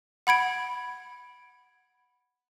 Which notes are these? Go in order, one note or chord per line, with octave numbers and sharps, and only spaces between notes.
F#5 B5 G#6 D7